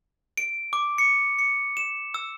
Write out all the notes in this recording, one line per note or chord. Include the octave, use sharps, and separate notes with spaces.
D7
D6
C#7
C#7
E7
E6